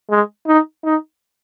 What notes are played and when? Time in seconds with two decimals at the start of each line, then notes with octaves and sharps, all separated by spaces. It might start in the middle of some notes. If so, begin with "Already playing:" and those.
0.10 G#3
0.47 D#4
0.84 D#4